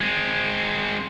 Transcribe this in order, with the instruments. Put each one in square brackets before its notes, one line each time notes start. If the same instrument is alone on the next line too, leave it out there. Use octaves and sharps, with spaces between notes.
[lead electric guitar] G#3 C4